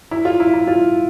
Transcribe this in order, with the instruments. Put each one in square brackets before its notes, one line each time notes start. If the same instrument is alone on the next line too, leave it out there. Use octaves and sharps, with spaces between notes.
[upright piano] E4
F4
E4
E4
F4